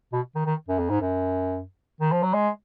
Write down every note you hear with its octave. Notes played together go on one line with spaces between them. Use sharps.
B2
D#3
D#3
F#2
F2
G#2
F#2
D#3
F3
F#3
G#3